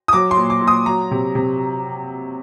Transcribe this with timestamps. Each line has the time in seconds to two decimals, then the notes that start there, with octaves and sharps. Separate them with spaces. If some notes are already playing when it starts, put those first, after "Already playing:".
0.08 D#6
0.13 F#3 D6
0.31 C6
0.37 A#2
0.50 D6
0.61 A#2
0.68 D#6
0.86 F#3 A#5
1.11 C3
1.35 C3